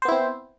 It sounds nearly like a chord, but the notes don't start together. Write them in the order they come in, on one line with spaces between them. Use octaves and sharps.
C5 B3 E4 C4